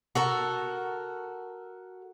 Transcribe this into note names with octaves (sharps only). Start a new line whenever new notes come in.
F#4 A4 A#4